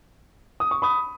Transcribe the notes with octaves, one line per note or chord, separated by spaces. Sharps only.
D#6
C#6
B5 D#6